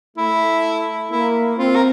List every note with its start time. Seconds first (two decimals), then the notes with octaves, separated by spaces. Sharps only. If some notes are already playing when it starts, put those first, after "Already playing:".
0.17 A3 E4
1.11 A#3 E4
1.58 C4 F4
1.75 A#4